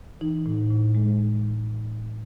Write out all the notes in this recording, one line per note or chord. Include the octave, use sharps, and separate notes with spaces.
E3 D#4
A2
A2
G#3